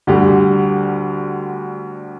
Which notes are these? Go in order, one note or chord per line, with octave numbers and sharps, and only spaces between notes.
D2 D3 G3